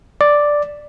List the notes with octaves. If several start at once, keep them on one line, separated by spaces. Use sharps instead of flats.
D5